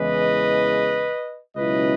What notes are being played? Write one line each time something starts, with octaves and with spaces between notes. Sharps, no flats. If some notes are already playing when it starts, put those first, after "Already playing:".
Already playing: E2 C#3 E3 G#3 B4 D#5
C#2 B2 F#3 C#4 E4 B4 D#5